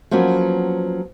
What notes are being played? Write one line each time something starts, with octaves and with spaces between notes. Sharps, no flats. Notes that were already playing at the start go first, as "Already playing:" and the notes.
F3 F#3 A#3 B3 C#4